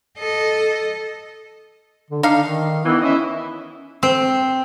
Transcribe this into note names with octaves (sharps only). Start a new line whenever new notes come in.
A4 D#5
D3
D4 D#4 F5
D#3
D#3 E3 B3
C#4 E4 D#5
C4